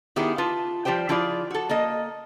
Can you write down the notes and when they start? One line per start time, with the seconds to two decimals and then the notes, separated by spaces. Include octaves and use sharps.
0.16 D#3 B3 E4 G4 G#4
0.38 F4 B4 A5
0.85 F3 G3 G4 C5 G5
1.09 F3 E4 F4 G#4 D5
1.51 F#4 A4
1.69 A#3 A4 D#5